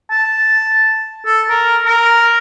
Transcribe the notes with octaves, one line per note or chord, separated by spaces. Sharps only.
A5
A4
A#4
A#4